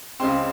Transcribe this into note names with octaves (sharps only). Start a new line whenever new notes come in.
C#2 C#3 G#3 C4 C6